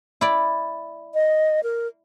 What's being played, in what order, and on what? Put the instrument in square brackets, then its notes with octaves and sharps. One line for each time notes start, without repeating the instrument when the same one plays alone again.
[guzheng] E4 D5
[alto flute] D#5
A#4